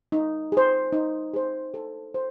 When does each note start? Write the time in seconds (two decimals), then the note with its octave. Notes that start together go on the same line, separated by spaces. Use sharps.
0.12 D#4
0.52 G#4 C5
0.93 D#4
1.34 G#4 C5
1.74 A4
2.14 C5